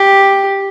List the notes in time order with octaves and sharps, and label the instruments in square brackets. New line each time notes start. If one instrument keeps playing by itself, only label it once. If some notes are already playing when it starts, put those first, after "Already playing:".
Already playing: [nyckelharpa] G4